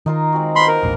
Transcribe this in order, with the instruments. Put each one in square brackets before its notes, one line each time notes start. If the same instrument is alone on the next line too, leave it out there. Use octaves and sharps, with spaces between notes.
[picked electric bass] D#3 [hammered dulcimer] D#4 F4 A#4
[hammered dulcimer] G#3 C4 F#4
[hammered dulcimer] B3 F4 C5 [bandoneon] B5 C6
[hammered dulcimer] D#4 F#5 [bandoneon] A#4
[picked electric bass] E1 A#1 [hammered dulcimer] A#3 C5